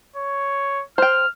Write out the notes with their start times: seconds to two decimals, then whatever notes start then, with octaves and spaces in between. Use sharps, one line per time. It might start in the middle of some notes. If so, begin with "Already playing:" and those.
0.16 C#5
0.98 C5 G5 F6